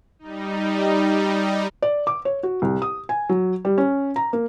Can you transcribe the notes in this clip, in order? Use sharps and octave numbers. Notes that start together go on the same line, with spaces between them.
G3 D#4
D5
D6
C#5
F#4
C2
D#6
G#5
F#3
G3
C#4
A#5
A#3